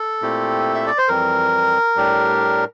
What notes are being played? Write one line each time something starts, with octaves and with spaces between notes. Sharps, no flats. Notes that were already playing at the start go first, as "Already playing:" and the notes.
Already playing: A4
A#2 A3 C4 E4 G4
E5
D5
C5
F2 E3 G3 C4 A#4
A2 G3 D4 G4